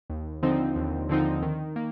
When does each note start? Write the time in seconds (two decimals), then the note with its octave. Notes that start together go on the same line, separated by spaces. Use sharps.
0.10 D#2
0.43 D3 F3 C4 D#4
0.76 D#2
1.09 D3 F3 C4 D#4
1.42 D#3
1.76 A#3